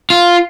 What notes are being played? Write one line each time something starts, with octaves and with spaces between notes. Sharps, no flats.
F4